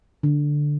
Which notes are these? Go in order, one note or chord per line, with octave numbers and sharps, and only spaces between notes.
D3